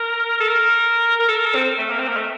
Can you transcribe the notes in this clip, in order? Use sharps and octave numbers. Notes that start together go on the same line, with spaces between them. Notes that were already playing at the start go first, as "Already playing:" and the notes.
Already playing: A#4
A4
A#4
A#4
A4
A#4
A4
C4
A3
A#3
C4
A#3
A3